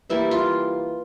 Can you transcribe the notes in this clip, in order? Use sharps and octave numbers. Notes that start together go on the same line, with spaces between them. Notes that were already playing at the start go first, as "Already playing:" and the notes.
E3 G3 A#3 E4
F4